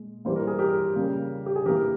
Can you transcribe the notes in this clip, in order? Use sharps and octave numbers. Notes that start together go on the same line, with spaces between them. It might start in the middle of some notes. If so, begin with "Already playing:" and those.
Already playing: A#2 G#3
E3 G3 A#3 C5
A#4
G#4
G4 A#4
C#3 G3 A#3
G4
G#4
E3 A#3 G4 A#4